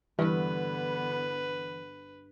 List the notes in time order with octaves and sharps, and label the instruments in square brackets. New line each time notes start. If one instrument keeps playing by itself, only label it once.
[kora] G2 [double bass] D3 B3 [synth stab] E3 [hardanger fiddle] B4